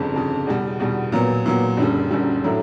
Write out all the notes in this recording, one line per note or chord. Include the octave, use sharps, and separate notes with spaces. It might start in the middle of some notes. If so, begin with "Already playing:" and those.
Already playing: G1 F2 C#3
G1 F2 C#3
E2 B2 G3
E2 B2 G3
A#2 F#3 B3
A#2 F#3 B3
F#1 F#2 D3 G3
F#1 F#2 D3 G3
A2 F#3 A3 D4